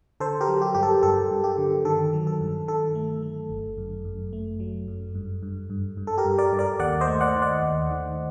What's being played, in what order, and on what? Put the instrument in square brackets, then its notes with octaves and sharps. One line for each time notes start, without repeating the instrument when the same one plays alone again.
[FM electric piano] D3 A4 C5
G4 A#4
F#3
G4
G2 G4
A4
G2 A4
G2
G4
D3
D#3 A4
F#3
A4
G2
D#3 A4
A3
A3
G1
F#2
F#2
A3
F#3
F#2
G2
G2
G2
G2
A4
G4 A#4
G2
A#4 D5
G2
A#4 D5
D#2 D5 F#5
C5 D#5
A3
D5 F#5
D#3
D5 F#5
D#2
D#3